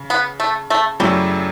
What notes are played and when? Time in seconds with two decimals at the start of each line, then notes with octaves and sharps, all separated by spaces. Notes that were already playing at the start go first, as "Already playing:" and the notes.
Already playing: C#3
0.10 B3
0.40 A3
0.70 A3
1.00 F#2 C#3 F#3 G3 A3 E4